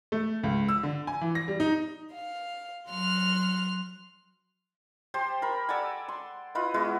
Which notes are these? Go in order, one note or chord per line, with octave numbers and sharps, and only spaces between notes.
A3
C#2
E6
D3
G#5
E3
A#6
G3
D#4
F5
F#3 C6 F6 F#6
G4 C5 A5 C6
A#4 B5
A4 D5 F#5 G#5
C6
E4 F4 B4 D#5
G#3 B3 E4 F#4